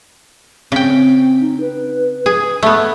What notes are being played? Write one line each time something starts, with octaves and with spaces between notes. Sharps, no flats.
C#3 C4 G5
D#4
B4
G#4
A3 B3